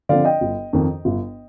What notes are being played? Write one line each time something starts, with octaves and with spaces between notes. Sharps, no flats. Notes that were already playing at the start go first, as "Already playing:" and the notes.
D3 F3 C4 D5 F5
D#5 G5
G1
F2 D#3
G1